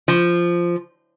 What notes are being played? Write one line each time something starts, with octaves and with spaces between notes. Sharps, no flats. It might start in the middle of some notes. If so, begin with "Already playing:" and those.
F3